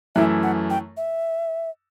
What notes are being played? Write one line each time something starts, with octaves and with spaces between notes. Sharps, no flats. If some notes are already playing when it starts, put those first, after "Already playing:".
F#2 E3 A3 E4 E5
F#5
G5
E5